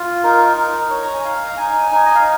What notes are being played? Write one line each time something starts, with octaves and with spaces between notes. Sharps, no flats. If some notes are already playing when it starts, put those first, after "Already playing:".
Already playing: F4
D#4 A#4
D#4
D#4 C#5
A#5
G#5
D#4 F5
A#5
D#4 G#5
D#4
D#5
F5